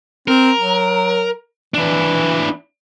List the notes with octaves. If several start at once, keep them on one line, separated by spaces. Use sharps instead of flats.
C4 A#4
F#3
E3 D4 E4